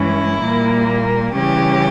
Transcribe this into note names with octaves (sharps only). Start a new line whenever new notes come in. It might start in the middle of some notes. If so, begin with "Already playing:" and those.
Already playing: G2 E3 G#3 C#4 E4
A#2 G3 A#3
C#3 E3 G3 C#4 G4